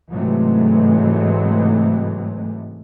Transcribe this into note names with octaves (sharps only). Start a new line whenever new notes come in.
G#2 C3 E3 F#3 G#3 A3